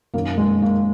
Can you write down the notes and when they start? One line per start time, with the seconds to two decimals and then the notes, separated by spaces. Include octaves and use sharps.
0.14 F#2 D#3 A#3
0.38 G#3
0.62 A#3